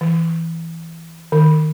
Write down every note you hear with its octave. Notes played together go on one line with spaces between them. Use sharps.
E3
D#3